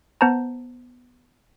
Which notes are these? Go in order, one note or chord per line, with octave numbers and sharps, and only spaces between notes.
B3 C5 A5 A#5